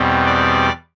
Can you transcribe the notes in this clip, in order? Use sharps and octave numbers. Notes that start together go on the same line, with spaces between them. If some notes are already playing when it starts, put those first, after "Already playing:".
Already playing: E2 B2 G3 C4
D5